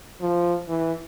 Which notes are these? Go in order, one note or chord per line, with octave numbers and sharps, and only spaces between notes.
F3
E3